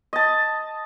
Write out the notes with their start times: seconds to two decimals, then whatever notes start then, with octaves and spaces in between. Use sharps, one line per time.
0.13 D#5 A5